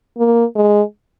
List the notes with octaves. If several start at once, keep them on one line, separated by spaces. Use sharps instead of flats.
A#3
G#3